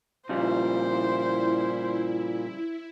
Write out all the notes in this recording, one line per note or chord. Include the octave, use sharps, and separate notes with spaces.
A#2 C#3 F3 G3 E4 C5